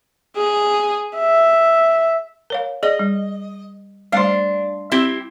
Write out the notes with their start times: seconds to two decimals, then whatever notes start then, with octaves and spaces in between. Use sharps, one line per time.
0.37 G#4
1.17 E5
2.50 A#4 C#5 F5
2.83 G#4 D5 D#5
2.99 G3
4.12 G3 A3 D4 C5 F5 C6
4.91 C4 E4 G4